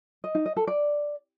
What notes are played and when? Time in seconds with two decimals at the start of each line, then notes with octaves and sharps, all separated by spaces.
0.24 D#5
0.35 D#4
0.46 D#5
0.57 A4
0.67 D5